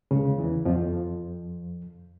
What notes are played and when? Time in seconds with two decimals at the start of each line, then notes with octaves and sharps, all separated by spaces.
0.11 C#2 C#3
0.38 E2 E3
0.65 F2 F3